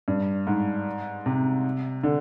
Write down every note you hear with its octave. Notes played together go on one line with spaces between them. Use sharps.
G2
G#2
C3
D3